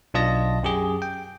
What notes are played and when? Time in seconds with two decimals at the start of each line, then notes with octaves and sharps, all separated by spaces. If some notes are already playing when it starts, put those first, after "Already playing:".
0.14 B1 D4 F4 D#5 A5 A#6
0.63 F#2 G4 G#4
1.02 G5